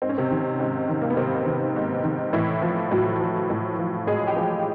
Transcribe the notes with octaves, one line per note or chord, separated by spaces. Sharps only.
G#2 C4
C#4
C3 C4
D#3
G#2
D#3
A#3
B3
G#2 C3 C4
D#3
G#2
D#3
A2 E3 E4
F3
A2 F#3 F#4
F3
A2
F3
A2 G#3 G#4
G4
F3 G#3 G#4